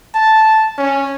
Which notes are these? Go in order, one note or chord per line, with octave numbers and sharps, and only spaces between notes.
A5
C#4